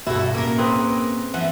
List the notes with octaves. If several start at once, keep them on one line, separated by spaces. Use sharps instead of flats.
D2 G2 B2 E4 F#4 A4
A2 A#3 C#4 A#4
C4 G#4 B4
E3 F3 F#5